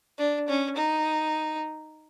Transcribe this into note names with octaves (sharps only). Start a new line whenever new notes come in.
D4
C#4
D#4